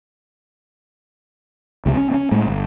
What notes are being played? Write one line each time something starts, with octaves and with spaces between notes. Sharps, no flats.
C#2 C3 G3 C4
C#4
C4 C#4
A2 G#3
G1